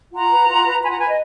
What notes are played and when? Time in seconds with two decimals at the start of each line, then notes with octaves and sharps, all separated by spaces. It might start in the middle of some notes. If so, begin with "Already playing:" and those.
0.14 F4 F#5 A#5
0.32 B4
0.48 F4
0.66 B4
0.82 F4 G#5 B5
0.91 F#5 A#5
0.99 B4 G#5 B5
1.08 D#5